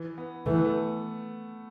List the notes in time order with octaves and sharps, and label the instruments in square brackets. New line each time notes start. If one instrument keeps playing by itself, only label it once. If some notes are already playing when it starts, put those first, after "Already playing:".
Already playing: [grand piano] E3
B3
[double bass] E3 [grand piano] A3
[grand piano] B3
A3